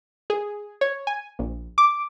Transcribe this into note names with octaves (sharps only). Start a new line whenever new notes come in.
G#4
C#5
G#5
A#1
D6